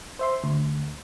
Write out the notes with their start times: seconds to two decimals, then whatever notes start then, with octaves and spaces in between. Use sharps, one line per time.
0.19 C5 E5 C6
0.44 D2